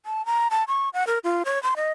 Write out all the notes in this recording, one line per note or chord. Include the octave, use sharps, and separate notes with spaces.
A5
A#5
A5
C#6
F#5
A#4
F4
C#5
C6
D#5